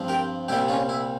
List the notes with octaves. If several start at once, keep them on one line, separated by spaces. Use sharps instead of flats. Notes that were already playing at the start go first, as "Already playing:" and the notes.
Already playing: G2 F3 C4
G4 A#4
C2 A#2 G3 E4 G4
C#4 F4
E4